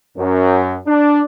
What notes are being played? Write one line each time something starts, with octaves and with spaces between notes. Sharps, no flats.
F#2
D4